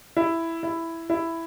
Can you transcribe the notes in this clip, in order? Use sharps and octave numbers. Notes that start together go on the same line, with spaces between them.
E4
E4
E4